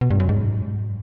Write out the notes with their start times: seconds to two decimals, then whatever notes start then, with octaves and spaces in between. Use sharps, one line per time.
0.01 B2
0.10 G2
0.20 F#2
0.29 G#2